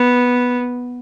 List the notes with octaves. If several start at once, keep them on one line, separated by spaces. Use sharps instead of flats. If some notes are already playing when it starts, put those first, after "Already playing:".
Already playing: B3